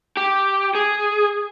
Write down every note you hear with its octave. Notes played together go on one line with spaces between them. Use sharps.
G4
G#4